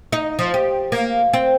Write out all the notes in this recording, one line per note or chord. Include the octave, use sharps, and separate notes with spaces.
D#4
F3
G4
A#3
C4